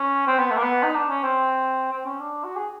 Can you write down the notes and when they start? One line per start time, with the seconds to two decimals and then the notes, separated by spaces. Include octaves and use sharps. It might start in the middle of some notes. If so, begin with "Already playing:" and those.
Already playing: C#4
0.27 C4
0.38 B3
0.50 A3
0.57 A#3
0.63 B3
0.83 D#4
0.95 D4
1.09 C#4
1.23 C4
1.92 C4
2.05 C#4
2.20 D4
2.44 F#4
2.56 G#4